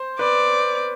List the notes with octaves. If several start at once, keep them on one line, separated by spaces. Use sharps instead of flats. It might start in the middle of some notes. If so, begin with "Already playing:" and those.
Already playing: C5
B4 D5